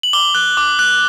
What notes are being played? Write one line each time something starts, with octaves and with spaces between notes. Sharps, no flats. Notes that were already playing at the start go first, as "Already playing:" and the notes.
F#7
D6 G7
F#6
D6
F#6